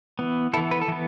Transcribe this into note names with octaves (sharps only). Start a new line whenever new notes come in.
E3 B3
E3 B3 E4 A4
B4
A4
E3 B3